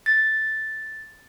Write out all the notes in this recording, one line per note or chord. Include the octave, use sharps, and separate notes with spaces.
A6